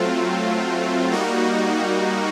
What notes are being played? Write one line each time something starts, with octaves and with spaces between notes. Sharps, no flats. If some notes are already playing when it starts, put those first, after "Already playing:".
Already playing: F#3 A3 C4 F4
G3 A#3 D#4 F#4